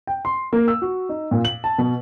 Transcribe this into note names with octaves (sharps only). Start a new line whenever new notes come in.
G5
C6
A#3
E6
F#4
D#4
A#2
F#7
A5
B2